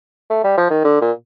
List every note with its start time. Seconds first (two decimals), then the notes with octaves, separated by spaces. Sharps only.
0.30 A3
0.44 G3
0.58 F3
0.70 D#3
0.84 D3
1.02 A#2